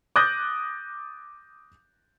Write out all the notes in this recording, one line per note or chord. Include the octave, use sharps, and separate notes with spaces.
D6 D#6 F#6 G6 A6 A#6